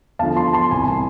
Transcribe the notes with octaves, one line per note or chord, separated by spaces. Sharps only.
E2 D3 F3 F5 A5
A5 C6
A5 C6
C2 C3 E3 G#5 B5